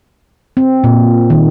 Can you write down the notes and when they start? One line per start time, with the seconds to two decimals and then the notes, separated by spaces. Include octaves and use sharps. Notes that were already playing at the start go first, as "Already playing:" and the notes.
0.57 C4
0.84 A#2
1.30 D#3